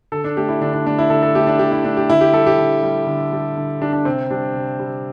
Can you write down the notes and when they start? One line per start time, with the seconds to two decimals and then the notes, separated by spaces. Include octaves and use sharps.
0.12 D3 A4
0.24 D4
0.37 A3 G4
0.48 E4
0.61 D3 D4
0.74 D4
0.86 A3 D4
0.99 E4
1.10 D3 A4
1.23 A4
1.35 A3 G4
1.47 D4
1.59 D3 G4
1.72 E4
1.84 A3 D4
1.97 G4
2.09 D3 E4
2.21 G4
2.33 G3 A4
2.46 G4
2.58 D3
2.83 G3
3.07 D3
3.33 G3
3.57 D3
3.81 G3 D4
3.93 D4
4.05 C3 C4
4.30 G3 D4
4.54 C3
4.79 G3